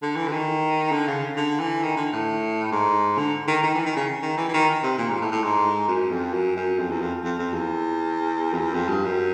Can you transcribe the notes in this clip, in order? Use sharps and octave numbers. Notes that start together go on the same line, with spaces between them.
D3
E3
D3
D#3
D3
C#3
D3
E3
D#3
D3
A2
G#2
D3
D#3
D#3
E3
D#3
C#3
D#3
E3
E3
D#3
C3
A#2
G#2
A2
A2
G#2
F#2
F2
F#2
F#2
F2
E2
F2
F2
F2
E2
F2
E2
F2
G2
F#2